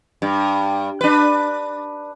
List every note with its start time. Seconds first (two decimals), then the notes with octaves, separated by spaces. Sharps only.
0.22 G2
1.01 D4 B4